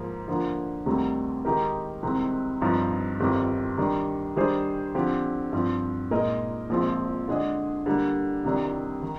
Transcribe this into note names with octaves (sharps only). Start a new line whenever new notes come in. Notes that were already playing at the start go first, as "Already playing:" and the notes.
Already playing: G#2 F3 A#3
D3 F3 A#3
D2 C3 D#3 G3
D#3 G#3 D#4 G4 A#4
C2 C3 D#3 G#3 C4
G1 G2 F3 C4 D#4
G1 F2 D#3 G3 C4
D#3 G3 D4
D#3 G3 D4 G#4 C5
D3 F3 C4 G4
G2 F3 C4
A#2 G#3 D#4 A#4 D#5
A#1 A#2 F3 G#3 C4
D3 G#3 D4 G#4 D#5
D3 G3 A#3
C2 C3 D#3 G3 D4
D#3